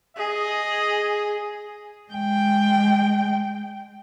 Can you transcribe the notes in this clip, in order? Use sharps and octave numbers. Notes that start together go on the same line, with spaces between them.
G#4 D#5
G#3 G5